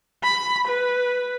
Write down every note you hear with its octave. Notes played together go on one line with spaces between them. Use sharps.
B5
B4